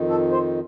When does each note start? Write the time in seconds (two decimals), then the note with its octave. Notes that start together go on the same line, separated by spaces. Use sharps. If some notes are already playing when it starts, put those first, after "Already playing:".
Already playing: F2 D#3
0.09 A4
0.32 C5